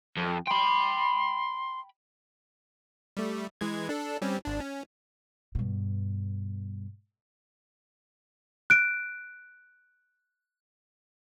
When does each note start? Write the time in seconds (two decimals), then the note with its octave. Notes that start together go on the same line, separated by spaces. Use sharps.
0.17 F2
0.47 G5 B5 C6
3.17 G3 A3
3.61 E3 G#3 G#6
3.89 D4 A4
4.22 G3 C4 C#4
4.45 G#1 D4
4.60 C#4
5.55 G2 B2
8.70 F#6 D7